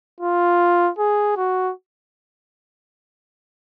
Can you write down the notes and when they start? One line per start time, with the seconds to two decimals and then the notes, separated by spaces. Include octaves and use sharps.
0.21 F4
0.98 G#4
1.37 F#4